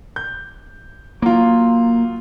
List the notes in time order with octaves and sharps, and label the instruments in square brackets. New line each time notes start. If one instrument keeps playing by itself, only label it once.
[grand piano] G6
[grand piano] F#3 F4 [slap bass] A#3